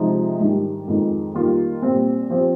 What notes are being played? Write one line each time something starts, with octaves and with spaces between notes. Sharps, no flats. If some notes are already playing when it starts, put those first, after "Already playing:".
Already playing: C3 F3 G#3 D#4
G#2 D#3 G3 D4
F2 D#3 G#3 D#4
D#3 G3 A#3 F4
A#2 G3 C4
F3 C4 G4 C5